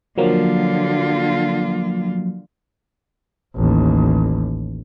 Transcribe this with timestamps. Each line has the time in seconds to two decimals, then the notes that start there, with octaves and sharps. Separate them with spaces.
0.18 D3 F3 F#3 A#3 F4
3.56 A1 D#2